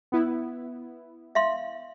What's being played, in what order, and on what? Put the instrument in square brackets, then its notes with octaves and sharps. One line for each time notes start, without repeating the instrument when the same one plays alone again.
[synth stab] B3 E4
[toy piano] E5 F5 C6